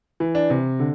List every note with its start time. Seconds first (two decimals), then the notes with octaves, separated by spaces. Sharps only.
0.20 E3
0.35 D4
0.50 C3
0.80 D3